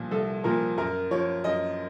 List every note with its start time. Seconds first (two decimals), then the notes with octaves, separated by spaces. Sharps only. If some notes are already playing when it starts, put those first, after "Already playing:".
Already playing: C2 A#2 F3
0.11 C2 A4
0.44 A#2 F3 A#4
0.78 F#2 A#4
1.11 F3 C#5
1.44 F#2 D#5